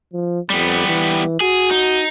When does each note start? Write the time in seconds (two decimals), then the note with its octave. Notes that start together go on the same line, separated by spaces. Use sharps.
0.13 F3
0.50 F2 G3 B3
0.87 E3
1.40 F#4 G#4
1.71 D#4